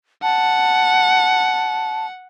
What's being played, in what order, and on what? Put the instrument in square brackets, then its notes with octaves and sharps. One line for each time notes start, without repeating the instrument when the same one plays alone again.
[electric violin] F#5 [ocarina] A5